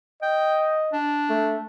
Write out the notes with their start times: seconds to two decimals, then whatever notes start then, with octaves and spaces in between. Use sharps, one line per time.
0.22 D#5 G5
0.93 D4
1.30 A3